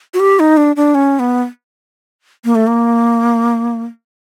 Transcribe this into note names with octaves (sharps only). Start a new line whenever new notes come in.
F#4
G4
D#4
D4
D4
C#4
B3
A#3
A3
A#3